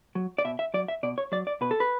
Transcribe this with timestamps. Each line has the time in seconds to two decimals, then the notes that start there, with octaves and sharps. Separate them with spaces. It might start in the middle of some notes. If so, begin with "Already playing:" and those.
0.15 F#3
0.38 D5
0.44 B2 E5
0.59 E5
0.74 F#3 D5
0.88 E5
1.03 B2 D5
1.18 C#5
1.32 F#3 D5
1.47 D5
1.61 B2 B4
1.71 A4
1.80 B4